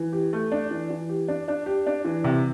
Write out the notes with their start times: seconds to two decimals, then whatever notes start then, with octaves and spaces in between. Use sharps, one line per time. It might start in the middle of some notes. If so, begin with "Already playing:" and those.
Already playing: E3
0.13 G4
0.33 A3
0.52 D4
0.71 E3
0.90 E3
1.09 G4
1.28 D4
1.48 D4
1.66 G4
1.87 D4
2.05 E3
2.24 C3